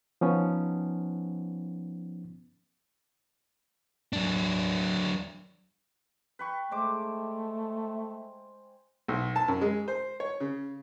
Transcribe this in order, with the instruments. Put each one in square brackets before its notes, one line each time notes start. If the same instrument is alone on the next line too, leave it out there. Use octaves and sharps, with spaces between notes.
[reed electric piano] F3 B3 C#4 D#4
[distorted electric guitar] F#3 D4
[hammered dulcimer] B4 G5 C#6
[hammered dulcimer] G#3 C5 D6 [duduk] A3
[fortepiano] B1
A5
F#2
G#3
C5
C#5
C#3